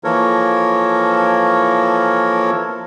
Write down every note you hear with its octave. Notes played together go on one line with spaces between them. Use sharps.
E3 F3 A#3 A4 A#4 C#5